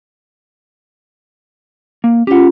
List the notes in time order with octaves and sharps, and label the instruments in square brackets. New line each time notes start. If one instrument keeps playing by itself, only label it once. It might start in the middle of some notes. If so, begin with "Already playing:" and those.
[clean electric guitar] A#3
[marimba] C#4 F4 [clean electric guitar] G4 F#5